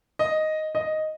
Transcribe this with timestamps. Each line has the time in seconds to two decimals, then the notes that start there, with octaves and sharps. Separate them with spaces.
0.19 D#5
0.75 D#5